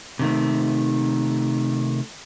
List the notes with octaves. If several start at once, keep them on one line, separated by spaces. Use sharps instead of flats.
C3 D#3 A3